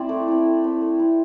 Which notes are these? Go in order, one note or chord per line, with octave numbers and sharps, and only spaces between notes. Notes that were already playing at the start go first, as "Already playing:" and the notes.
Already playing: C4 E4 D5
A3
C4 E4
A3
C4 E4
A3
C4 E4